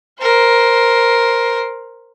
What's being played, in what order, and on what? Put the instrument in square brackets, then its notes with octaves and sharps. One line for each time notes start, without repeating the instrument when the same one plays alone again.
[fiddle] A#4 C5